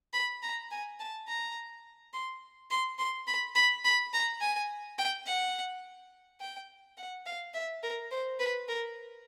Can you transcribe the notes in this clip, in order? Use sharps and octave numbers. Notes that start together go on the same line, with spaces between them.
B5
A#5
G#5
A5
A#5
C6
C6
C6
B5
B5
B5
A#5
G#5
G5
F#5
G5
F#5
F5
E5
A#4
C5
B4
A#4